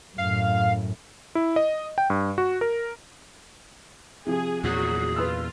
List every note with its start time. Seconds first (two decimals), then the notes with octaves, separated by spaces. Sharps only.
0.18 F#2 A2 F5
1.35 E4
1.56 D#5
1.98 G5
2.10 G2
2.38 F#4
2.61 A#4
4.26 C3 F3 G#4
4.64 E2 A#2 F#3 F#4 G#4
5.16 F4 B4 E6